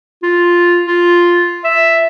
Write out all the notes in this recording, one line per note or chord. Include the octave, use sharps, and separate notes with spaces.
F4
F4
E5